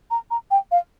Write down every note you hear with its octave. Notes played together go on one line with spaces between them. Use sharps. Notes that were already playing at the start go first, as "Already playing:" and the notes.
A#5
A#5
G5
F5